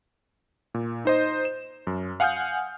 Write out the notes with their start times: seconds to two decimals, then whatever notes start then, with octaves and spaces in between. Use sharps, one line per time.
0.74 A#2
1.05 D#4 C5 D#5
1.45 E7
1.87 F#2
2.20 F5 F#5 G#5 D#6 F6 G6